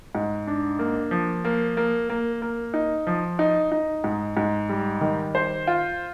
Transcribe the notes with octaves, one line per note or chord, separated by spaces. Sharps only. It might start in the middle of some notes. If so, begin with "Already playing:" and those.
G#2
D4
A#3
F3
A#3
A#3
A#3
A#3
D#4
F3
D#4
D#4
G#2
G#2
G3
D#3
C5
F4